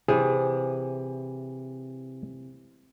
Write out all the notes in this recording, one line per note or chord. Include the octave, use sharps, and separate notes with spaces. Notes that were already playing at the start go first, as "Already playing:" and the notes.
C3 E3 G#4